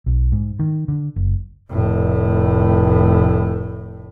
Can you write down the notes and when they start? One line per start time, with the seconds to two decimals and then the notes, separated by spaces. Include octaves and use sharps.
0.06 B1
0.32 G#2
0.59 D#3
0.88 D3
1.16 F#1
1.70 F1 A2